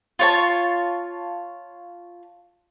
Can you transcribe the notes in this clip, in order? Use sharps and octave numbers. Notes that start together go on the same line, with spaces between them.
F4 C#5 A5